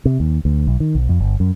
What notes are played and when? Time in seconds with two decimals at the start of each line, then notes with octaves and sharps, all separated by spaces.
0.05 C3
0.20 D#2
0.45 D2
0.67 B1
0.80 D#3
0.95 B1
1.09 F2
1.20 G1
1.40 F#2